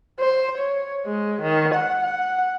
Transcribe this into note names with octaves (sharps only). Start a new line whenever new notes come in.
C5
C#5
G#3
D#3
F#5
F#5